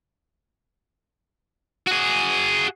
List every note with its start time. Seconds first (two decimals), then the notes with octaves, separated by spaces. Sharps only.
1.87 F#4 G#4